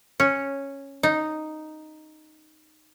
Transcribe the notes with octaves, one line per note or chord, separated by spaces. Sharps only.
C#4
D#4